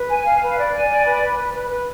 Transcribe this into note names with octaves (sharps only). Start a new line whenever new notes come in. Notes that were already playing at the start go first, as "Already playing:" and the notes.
Already playing: B4
G#5
F5
B4
D5
G#5
D5
B4
B4
B4
B4
B4